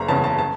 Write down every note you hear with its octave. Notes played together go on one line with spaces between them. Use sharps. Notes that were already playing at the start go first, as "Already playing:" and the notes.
Already playing: F#1 A#5
E2 C#3 A5
A5
A5